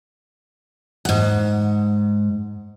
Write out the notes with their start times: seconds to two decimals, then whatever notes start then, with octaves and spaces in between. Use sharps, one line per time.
1.05 G#2 F#5